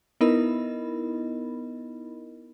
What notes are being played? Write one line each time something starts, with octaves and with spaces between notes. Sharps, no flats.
B3 D#4 E4 A#4 D#5 B5